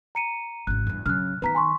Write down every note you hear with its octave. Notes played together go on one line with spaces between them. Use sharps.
A#5 C#7 D#7
G#1 C#3 F#6
E2 G2
C#3 F#3 F6 F#6
D#3 B3 B4 A#5 B6
G#5 C6 C#6